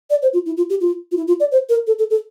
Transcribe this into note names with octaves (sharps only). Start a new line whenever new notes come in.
D5
C5
F4
E4
F4
G4
F4
F4
E4
F4
D5
C5
A#4
A4
A4
A4